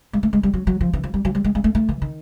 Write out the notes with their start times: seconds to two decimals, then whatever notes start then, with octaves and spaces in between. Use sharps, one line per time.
0.13 G#3
0.23 A3
0.33 G#3
0.43 G3
0.54 F#3
0.67 F#3
0.81 F3
0.93 E3
1.04 F3
1.14 G3
1.25 F#3
1.35 G3
1.44 G#3
1.55 G#3
1.64 A3
1.75 A3
1.89 E3
2.02 D#3